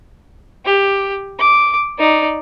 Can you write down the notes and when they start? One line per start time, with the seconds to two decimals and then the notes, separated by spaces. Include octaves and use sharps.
0.65 G4
1.39 D6
1.99 D#4 D5